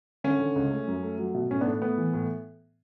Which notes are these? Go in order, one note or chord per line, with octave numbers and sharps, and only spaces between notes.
D3 C#4
D3
C#2
A3
F#2
A3
F#3
B2
A2 C#4
B3 D4
A2
A3 B3
E3
A2